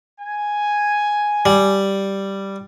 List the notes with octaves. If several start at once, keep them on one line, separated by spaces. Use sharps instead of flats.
G#5
G3